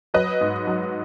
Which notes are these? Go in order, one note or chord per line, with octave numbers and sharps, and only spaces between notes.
F#3 B4 D#5
G#2
F#3